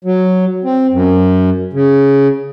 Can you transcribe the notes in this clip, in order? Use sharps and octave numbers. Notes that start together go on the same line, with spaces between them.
F#3
C4
F#2
C#3